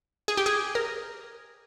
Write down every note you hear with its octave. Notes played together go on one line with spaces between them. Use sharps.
G#4
G4
G#4
A#4